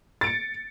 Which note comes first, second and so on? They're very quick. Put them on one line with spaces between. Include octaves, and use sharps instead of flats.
A6 D7 C#7